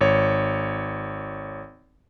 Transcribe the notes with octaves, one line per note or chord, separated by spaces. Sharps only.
G#1 C#5